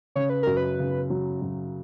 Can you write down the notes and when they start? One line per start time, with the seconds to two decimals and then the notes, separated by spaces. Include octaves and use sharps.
0.16 C#3 C#5
0.30 B4
0.43 F#2 A#4
0.57 B4
0.79 C#3
1.10 F#3
1.42 F#2